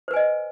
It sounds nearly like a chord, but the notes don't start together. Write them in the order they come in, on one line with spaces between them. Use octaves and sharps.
C5 B4 G#5 D#5